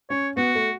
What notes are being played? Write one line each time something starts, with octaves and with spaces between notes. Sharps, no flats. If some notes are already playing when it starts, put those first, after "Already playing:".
C#4 C#5
B3 F#4
A3